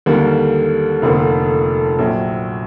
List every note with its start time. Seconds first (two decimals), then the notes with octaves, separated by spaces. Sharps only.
0.06 D#2 D3 G3 A#3
1.02 F1 F2 D3 F3 A#3
1.98 A#1 A#2 F#3